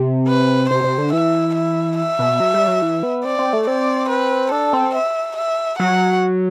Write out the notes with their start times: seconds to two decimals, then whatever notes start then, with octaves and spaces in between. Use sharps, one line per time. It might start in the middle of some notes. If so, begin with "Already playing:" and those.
Already playing: C3
0.28 B4
0.70 C3 C5
0.84 C3
0.98 D3
1.13 E3 E5
1.55 E5
1.97 E5
2.19 B2
2.40 F#3
2.54 G3
2.68 F#3
2.82 E3
3.03 B3
3.25 C4 D5
3.39 C4
3.53 A3
3.67 C4 D5
4.09 B4
4.52 D4 A4
4.73 C4
4.95 E5
5.37 E5
5.79 F#3 F#5